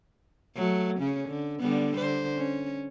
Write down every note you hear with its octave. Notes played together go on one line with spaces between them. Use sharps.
F#3 A3
C#3 C#4
D3
D3 G3 B3
D3 C5
C#4